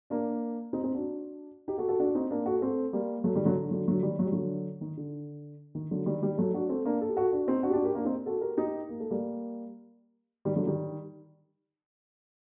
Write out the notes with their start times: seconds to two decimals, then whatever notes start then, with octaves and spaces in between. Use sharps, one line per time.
0.10 A#3 D4
0.73 C4 D#4
0.84 C4 D#4
0.95 D4 F#4
1.68 D#4 G4
1.78 F#4 A4
1.88 F#4 A4
1.99 D4 F#4
2.15 C4 D#4
2.30 A#3 D4
2.46 F#4 A4
2.61 A3 C4
2.93 G3 A#3
3.24 F#3 A3
3.35 D#3 G3
3.45 D3 F#3
3.56 D3
3.71 D3 F#3
3.88 D3 F#3
4.03 D#3 G3
4.19 F#3
4.25 G3
4.32 D3 F#3
4.81 D#3
4.97 D3
5.75 D#3
5.91 D3 F#3
6.06 D#3 G3
6.22 D#3 G3
6.37 F#3 A3
6.54 D4 F#4
6.69 A3 C4
6.85 A#3 D4
7.01 A4
7.09 G4
7.16 F#4 A4
7.32 D4 F#4
7.47 C4 D#4
7.63 D4 F#4
7.70 G4
7.73 D4 F#4
7.84 G4 A#4
7.95 A#3 D4
8.05 C4 D#4
8.26 F#4 A4
8.41 G4 A#4
8.57 D#4 G4
8.89 A#3
9.00 A3
9.10 G3 A#3
10.45 D#3 G3
10.56 D3 F#3
10.66 D#3 G3